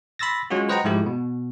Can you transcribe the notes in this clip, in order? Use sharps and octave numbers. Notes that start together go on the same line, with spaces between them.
B5 C6 E6 A6 A#6
F#3 G#3 C#4 F4 F#4
B4 C5 D#5 F#5 G5 A#5
G#2 F3 G#3 A3 E4 G4
B2